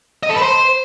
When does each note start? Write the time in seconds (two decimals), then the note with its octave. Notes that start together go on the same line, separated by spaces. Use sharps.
0.23 D#5
0.29 A4
0.36 B4
0.42 C5